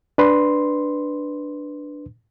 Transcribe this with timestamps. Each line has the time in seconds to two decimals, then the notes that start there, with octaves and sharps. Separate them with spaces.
0.18 D4 B4 C6